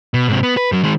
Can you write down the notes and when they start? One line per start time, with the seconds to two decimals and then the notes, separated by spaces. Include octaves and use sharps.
0.14 B2
0.28 G#2 C3
0.43 B3
0.57 B4
0.72 F#2 F#3
0.83 D#3 G#3